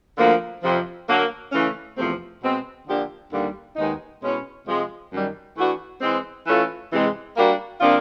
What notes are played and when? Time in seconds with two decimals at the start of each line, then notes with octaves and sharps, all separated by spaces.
0.17 D2 D3 F3 A#3
0.62 F2 C3 F3
1.08 D3 F#3 A#3
1.52 C#3 E3 A3 C#4
1.97 E2 C3 F3 A3 C4
2.42 B2 G#3 C4
2.86 D3 F3 A#3 D4 G4
3.32 D#2 D3 G3 A#3
3.76 D#2 D#3 G#3 B3 D#4
4.21 B2 G#3 C#4 E4
4.66 C3 F3 G#3
5.11 F#2 D#3 G3
5.56 E3 A3 D4 F#4 B4
6.01 E3 G#3 C4
6.46 E3 A3 C#4 F4 A4
6.91 C3 E3 G#3
7.36 G3 A#3 D4 F#4 A#4
7.81 C3 F3 A#3 D4 F4